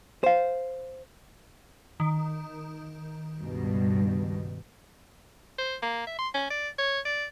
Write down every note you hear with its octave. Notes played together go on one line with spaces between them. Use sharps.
C5 F5
D#3
C#2 G2 B2
C5
A#3
E5
C6
C#4
D5
C#5
D5